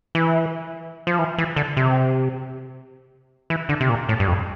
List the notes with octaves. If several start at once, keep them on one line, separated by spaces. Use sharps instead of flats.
E3
F3
E3
E3
D3
C3
E3
D3
C3
A#2
A2
G2
F2